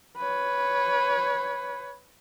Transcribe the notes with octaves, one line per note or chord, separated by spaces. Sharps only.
B4 C#5